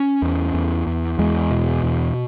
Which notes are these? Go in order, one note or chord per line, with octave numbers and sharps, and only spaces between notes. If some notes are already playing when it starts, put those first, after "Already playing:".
Already playing: C#4
E2
E2
E2
E2 G#3
B2
E2